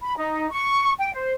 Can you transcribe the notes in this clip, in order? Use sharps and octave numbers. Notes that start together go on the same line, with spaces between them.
B5
D#4
C#6
G5
C5